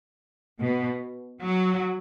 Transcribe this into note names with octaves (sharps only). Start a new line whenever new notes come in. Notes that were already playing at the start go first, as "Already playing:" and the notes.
B2
F#3